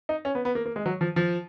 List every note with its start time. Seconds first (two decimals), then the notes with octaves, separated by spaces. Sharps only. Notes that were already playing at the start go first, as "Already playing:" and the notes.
0.09 D#4
0.25 C#4
0.35 B3
0.45 B3
0.55 A#3
0.66 A#3
0.76 G#3
0.86 F#3
1.01 F3
1.16 F3